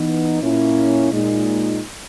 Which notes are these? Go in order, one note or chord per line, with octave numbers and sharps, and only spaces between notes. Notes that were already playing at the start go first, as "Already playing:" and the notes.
Already playing: E3 B3 D#4
A#2 A#3 C#4 E4
A#2 G#3 D#4